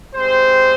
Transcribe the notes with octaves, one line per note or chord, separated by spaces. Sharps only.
G#3 C4 G4 C5